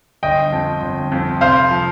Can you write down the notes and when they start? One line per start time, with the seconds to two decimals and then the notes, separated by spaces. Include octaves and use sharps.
0.23 G1 D#5 G5
0.52 F2 F3
0.82 G1
1.12 F2 F3
1.41 F1 C5 F5
1.71 F3